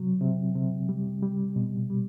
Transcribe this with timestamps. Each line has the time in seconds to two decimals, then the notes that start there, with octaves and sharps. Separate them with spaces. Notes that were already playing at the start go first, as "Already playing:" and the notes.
Already playing: C3 F#3
0.21 C3
0.55 C3
0.89 G3
1.22 G3
1.56 B2
1.90 G3